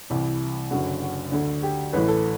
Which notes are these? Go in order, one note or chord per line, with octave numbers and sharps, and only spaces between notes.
C2 C3 E3 E4
F#1 F#2 D3 F#4
F#4
D2 D3
G4
A1 A2 E3 B4
A4